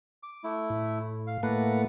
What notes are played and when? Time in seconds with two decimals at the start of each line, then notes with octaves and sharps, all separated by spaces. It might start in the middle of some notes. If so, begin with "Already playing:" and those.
0.23 D6
0.44 A3 E4
0.70 A2
1.27 F5
1.43 A2 A3 A#3 B4 F#5